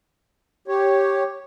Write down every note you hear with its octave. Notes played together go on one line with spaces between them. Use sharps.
G4 C#5